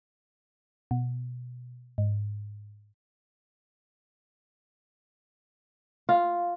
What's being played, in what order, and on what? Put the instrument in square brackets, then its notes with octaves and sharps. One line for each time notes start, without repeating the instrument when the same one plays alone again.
[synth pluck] B2
G#2
[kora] F4